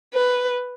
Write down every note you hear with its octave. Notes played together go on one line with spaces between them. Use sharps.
B4